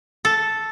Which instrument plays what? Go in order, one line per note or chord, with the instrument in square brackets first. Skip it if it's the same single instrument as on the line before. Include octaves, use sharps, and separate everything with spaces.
[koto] A4